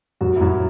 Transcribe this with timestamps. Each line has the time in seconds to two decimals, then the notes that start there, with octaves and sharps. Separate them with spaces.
0.21 F#2 F#4
0.36 E4
0.41 F#2 F#4